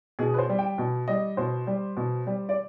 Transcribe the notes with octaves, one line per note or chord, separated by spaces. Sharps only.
B2 G#4
B4
C5
G3
G5
B2
G3 D#5
B2 C5
G3
B2
G3
D5